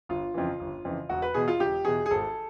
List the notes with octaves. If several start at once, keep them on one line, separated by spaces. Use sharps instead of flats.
G1 F4
F2 C#3 E3
G1
F2 C#3 E3
E1 F#4
B4
E2 B2 G#4
F4
E1 G4
E2 B2 G#4
G#4
G#1 A4